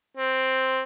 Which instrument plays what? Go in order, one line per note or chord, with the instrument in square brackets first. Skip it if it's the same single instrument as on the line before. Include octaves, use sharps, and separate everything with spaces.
[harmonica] C4